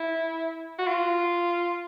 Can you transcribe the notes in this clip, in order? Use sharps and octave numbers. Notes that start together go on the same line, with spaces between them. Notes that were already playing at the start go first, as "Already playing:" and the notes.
Already playing: E4
F#4
F4